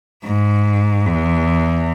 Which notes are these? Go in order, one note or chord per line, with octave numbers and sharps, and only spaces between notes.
G#2
E2